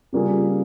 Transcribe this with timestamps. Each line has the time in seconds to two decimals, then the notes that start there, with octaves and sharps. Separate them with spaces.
0.13 C#3 G3 A#3 F4 G#4